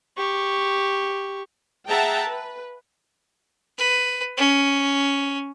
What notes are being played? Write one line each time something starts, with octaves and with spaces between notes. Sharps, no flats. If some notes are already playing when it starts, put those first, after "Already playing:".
G4 C#6
G#4 E5 F#5 G5 A5 A#5
B4
B4
C#4